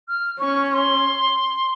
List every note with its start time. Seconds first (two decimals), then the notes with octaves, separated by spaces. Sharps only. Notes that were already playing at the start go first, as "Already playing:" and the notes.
0.08 F6
0.40 C#4 C#6
0.73 C6